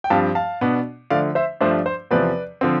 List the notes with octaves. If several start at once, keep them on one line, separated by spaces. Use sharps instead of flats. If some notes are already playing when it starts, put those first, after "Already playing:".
G5
G2 F3 C4 F5 A5
F5 A5
B2 B3 D4
D3 F3 A3 D5 F5
C5 E5
G2 F3 A3 D4 C5
C5
E2 C3 F3 C4 B4 D5
D3 F3 C4